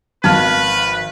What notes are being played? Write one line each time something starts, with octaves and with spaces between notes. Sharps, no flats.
G#1 F3 B4 F5 A5 F6